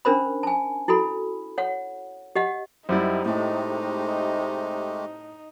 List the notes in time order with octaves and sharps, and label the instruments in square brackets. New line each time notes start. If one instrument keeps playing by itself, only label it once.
[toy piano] C#4 D4 A#4 C5 B5
G#5 A5
E4 F#4 A4 B5
C#5 F#5
G4 D#5 F#5
[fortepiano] F#2 G3 E4 [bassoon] C3 [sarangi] D#4
[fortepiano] A2 [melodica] G#3 A3 G4